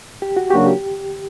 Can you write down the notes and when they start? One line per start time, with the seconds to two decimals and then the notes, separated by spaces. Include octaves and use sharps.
0.22 G4
0.37 F#4
0.50 C#3 F#3 A#3 D4 F#4 G4
0.66 G4